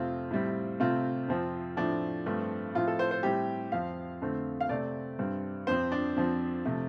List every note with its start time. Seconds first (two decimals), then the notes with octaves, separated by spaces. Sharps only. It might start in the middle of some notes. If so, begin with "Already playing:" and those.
Already playing: F2 C3 A3 C4 F4
0.31 A2 G3 C4
0.80 C3 A3 C4 F4
1.28 F2 F3 C4
1.77 A2 F3 A3 C4 D4
2.26 G2 F3 A3 C4
2.75 A2 F3 C4 F4
2.88 A4
2.99 C5
3.11 C5
3.23 A2 G3 C4 G4
3.72 F2 F3 C4 F5
4.21 F2 D3 A3 C4
4.61 F5
4.69 C3 A3 C4 D5
5.19 G2 G3 C4
5.67 F2 F3 C4 C5
5.92 D4
6.16 F2 F3 C4
6.65 C3 F3 A3